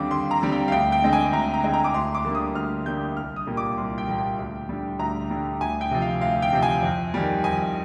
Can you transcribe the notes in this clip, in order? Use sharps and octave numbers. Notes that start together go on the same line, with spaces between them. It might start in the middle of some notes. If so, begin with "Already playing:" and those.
Already playing: D#2 D3 G3 C4 D6
D#2 C6
A#5
D3 G3 C4
G5
F5
D2 G5
G5
D3 G#3 C4
G#5
D2 A#5
A#5
D3 G#3 C4
A#5
D6
D2 C6
D6
D3 G3 A#3
D#6
D2 F6
D3 G3 A#3 G6
C2 F6
D#6
A#2 G3 A#3
D6
C2 C6
G5
A#2 G3 A#3
G5
D2
D3 G3
D2 A#5
D3 G3
D2 G#5
G5
C3 F3
F5
D2 F5
G5
C3 F3
G#5
F2
D#3 G3
F2 G#5